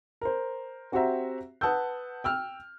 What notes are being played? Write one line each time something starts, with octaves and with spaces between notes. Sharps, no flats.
A#4 C5
C4 F#4 G4 C5 E5 A#5
B4 F#5 A5 D#6 E6 G6
G5 E6 F6